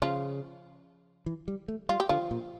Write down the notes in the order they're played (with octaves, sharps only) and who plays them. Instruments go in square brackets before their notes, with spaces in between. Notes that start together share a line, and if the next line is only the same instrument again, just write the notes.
[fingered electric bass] C#3 [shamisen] F3 F4
[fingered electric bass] E3
G3
A3
[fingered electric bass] G3 [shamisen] F4
[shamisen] G4
[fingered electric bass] D3 [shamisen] F3 F4
[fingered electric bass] A#2